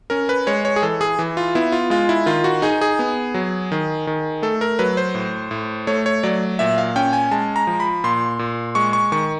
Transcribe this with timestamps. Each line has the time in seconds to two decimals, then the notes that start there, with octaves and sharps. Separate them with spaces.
0.10 C#4 A#4
0.29 B4
0.47 G#3 C#5
0.65 C#5
0.76 G#4
0.82 E3 A4
1.01 G#4
1.19 E3
1.37 F4
1.55 B3 E4
1.72 F4
1.90 G#3 F4
2.09 E4
2.26 D#3 F4
2.44 F#4
2.62 D#4 G#4
2.81 G#4
2.99 B3
3.34 F#3
3.72 D#3
4.07 D#3
4.42 A3 A4
4.61 A#4
4.79 F#3 B4
4.97 C5
5.15 A2
5.51 A2
5.87 A3 C#5
6.06 C#5
6.23 F#3 D5
6.59 A#2 E5
6.78 F5
6.96 C#4 G5
7.13 G#5
7.31 G#3 A5
7.56 A#5
7.67 F3
7.80 B5
8.04 A#2 C6
8.39 A#2
8.75 G#3 C#6
8.93 C#6
9.12 D#3 C#6